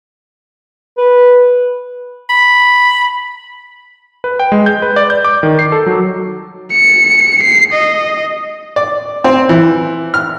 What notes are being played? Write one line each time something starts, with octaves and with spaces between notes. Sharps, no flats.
B4
B5
B4
G5
G#3
G6
B4
D5
G6
D6
D#3
C7
A4
F#3
C#7
C7
D#5
D5
C4
E3
F6